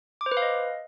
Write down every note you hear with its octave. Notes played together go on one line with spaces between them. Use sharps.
D6
C5
B4
F5
D#5